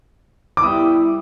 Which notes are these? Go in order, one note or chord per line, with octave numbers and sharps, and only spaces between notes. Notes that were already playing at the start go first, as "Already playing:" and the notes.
D6
G3 B3 E4 D#6